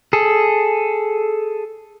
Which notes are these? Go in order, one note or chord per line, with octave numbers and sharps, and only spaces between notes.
G#4 A4